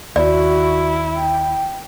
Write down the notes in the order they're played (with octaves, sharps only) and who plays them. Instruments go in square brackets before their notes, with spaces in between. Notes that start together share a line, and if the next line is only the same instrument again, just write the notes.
[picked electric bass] D#2 [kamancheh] E4 [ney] F#4 [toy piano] D5
[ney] G5